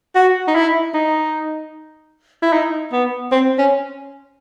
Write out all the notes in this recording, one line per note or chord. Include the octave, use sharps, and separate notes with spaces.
F#4
D#4
E4
D#4
E4
D#4
B3
C4
C#4